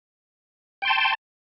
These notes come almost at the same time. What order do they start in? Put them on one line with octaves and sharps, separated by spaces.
G5 C6 A5